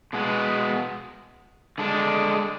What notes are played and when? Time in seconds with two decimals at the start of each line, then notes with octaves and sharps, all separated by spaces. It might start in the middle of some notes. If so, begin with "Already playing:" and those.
0.13 B2 G#3 B3
1.78 D3 G#3 D4